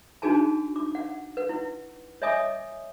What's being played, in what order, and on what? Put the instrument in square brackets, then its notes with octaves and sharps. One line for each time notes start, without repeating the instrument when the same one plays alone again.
[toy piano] D4 D#4 F#4 G#4 G#5 A5
D6
F#5
B4 F#5
E4
C#5 D#5 E5 G#5 D6 D#6